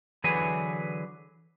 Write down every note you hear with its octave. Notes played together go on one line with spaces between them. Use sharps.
D3 E3 F#3 G#4 B4 G#5